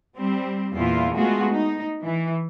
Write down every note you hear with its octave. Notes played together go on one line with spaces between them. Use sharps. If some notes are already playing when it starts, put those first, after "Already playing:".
G3 C4
E2 A#2 E4 F4
G#3 A3 B3 F4 F#4 G#4
D#4
E3